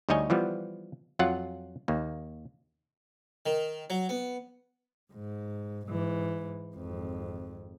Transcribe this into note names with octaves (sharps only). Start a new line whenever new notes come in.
D2 G3 D#4 C#5 D#5 G#5
E3 F3 G3 B3
F2 F#3 F4 F#5
D#2 A#3
D#3
F#3
B3
G#2
G#2 E3
G#1 F2